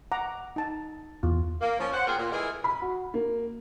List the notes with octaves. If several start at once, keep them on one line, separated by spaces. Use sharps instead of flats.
F#5 A#5 D6
D#4 A5
E2 F4
A#3
F3 C#4
C5 F#5
A#3 C4 F4 G#4 A#4
A#2
E3 G#3 A3 G#4 A#4
B5
F#4
A#3